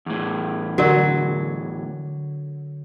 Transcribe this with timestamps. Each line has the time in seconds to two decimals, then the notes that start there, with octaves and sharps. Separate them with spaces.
0.06 E2 A2
0.78 D3 F#3 F#4 A#4 D5